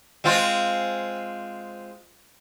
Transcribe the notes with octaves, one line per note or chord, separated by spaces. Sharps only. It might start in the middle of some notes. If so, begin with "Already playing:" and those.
G#3 C4 F4